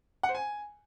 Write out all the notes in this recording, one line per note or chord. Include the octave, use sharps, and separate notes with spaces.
F#5
C5
G#5